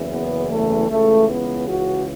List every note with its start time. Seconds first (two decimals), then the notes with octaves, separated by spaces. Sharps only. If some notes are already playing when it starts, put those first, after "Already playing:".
Already playing: F#1 E2 C#3 E3
0.11 B3
0.51 A3
0.90 C#2 C#3 E3 A3
1.29 B3
1.68 F#4